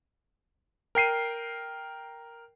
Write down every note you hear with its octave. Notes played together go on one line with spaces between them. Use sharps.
A#4 G5 C7 D#7